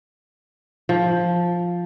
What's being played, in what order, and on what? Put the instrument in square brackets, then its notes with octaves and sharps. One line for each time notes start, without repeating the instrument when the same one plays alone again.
[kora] F3